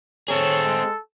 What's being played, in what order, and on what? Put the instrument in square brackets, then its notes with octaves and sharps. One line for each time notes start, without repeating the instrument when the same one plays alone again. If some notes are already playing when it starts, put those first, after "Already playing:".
[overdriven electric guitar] C4 G#4 [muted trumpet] A4 [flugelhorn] C#5
[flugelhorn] G#3